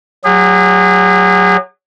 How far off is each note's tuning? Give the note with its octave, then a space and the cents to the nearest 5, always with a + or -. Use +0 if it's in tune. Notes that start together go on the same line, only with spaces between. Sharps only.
F#3 +0 G#4 -40